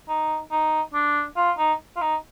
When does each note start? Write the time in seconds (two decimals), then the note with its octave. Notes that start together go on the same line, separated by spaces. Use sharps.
0.09 D#4
0.51 D#4
0.94 D4
1.36 F4
1.58 D#4
1.96 F4
2.01 D#4